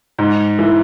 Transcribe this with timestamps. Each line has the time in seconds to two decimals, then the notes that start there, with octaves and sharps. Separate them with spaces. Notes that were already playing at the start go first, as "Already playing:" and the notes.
0.19 G#2
0.59 E3